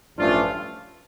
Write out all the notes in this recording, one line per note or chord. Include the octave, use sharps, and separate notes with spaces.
A1 G2 F3 A3 C#4 D4 F4